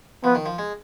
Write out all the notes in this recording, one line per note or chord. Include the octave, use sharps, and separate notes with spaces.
F3 B3
D#3
F3
G#3